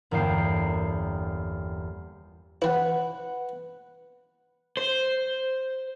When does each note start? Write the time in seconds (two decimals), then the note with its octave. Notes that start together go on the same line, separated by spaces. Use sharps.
0.11 G1 E2 A#3 G5 C7
2.62 E3 E4 B4 F#5
4.77 C5